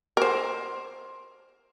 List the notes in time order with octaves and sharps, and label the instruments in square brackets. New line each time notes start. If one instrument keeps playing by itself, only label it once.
[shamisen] A#4 C5